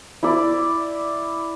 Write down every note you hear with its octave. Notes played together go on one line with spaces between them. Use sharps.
E4 D5